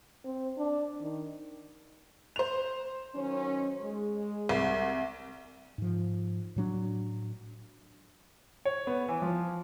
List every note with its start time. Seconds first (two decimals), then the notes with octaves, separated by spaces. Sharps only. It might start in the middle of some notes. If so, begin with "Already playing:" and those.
0.24 C4
0.58 D4
1.01 D#3
2.36 C5 F7
3.15 D#3 F#3 C#4
3.81 G#3
4.49 C2
5.78 G#2 F3
6.56 A2 F#3 D4
8.65 C#5
8.87 B3
9.08 E3
9.22 F3